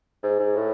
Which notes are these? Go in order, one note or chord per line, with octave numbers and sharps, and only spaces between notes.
G#2
G#2
A2